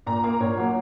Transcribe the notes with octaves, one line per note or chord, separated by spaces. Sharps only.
A#2 A#5
A#3 A#5
A#2 C#5
F#3 A#3